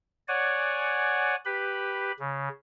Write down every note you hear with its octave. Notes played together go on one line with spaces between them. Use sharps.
C#5 D5 F#5 G#5
G4 B4 B5
C#3